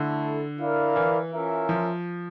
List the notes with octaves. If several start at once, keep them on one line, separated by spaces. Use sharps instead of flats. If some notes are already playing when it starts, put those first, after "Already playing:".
Already playing: D3 A3 E4 A4
E4 A#4 D5 F5
E3
C#4 F4 A#4 E5
F3